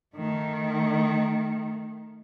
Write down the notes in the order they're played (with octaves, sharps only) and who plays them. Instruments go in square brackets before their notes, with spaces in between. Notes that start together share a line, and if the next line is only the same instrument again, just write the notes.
[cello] D#3 A3